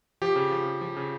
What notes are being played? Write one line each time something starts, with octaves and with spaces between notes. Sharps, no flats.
F3 G4
C#3
F3
C#3
F3
C#3